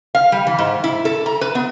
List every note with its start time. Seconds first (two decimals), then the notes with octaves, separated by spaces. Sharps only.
0.15 F5
0.32 G3
0.47 E3
0.59 G#2
0.84 E4
1.05 A4
1.26 A#5
1.41 B4
1.55 B3